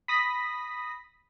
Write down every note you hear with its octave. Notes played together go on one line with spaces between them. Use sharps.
B5 D#6 A#6 B6